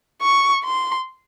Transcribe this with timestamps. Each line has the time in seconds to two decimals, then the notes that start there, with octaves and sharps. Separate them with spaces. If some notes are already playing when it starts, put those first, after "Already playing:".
0.22 C#6
0.64 C6